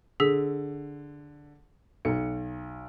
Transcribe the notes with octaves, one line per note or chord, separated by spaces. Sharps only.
D3 G#4 E6 B6
B1 C#7